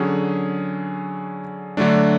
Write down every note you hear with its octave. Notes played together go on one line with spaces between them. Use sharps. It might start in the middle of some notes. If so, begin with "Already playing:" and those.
Already playing: D3 F#3 C#4 G#4
D3 F#3 A3 D4